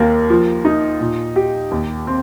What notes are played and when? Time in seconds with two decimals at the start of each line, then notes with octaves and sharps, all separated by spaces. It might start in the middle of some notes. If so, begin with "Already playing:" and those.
Already playing: D#2 A#3
0.30 F3
0.65 D#4
1.01 A#2
1.36 G4
1.71 D#2
2.07 C4